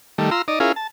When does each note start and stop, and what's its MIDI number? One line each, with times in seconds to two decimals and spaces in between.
0.18 0.30 51
0.18 0.30 55
0.18 0.30 57
0.31 0.42 65
0.31 0.42 82
0.31 0.42 84
0.31 0.42 88
0.48 0.59 63
0.48 0.59 74
0.48 0.59 75
0.60 0.72 61
0.60 0.72 64
0.60 0.72 65
0.60 0.72 68
0.60 0.72 70
0.60 0.72 77
0.76 0.87 81